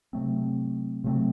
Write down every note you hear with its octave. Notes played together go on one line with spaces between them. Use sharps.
C3 F#3 A3 C4
C3 F#3 A3 C4